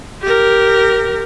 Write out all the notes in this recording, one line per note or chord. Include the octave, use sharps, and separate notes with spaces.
G4 A#4